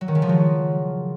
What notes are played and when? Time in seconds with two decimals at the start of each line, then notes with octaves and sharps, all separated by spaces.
0.01 F#3
0.08 D#3
0.15 C#3
0.22 F3
0.29 F#3